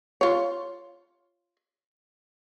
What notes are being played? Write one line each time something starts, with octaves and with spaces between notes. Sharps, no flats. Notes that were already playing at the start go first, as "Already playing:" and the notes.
F4 C#5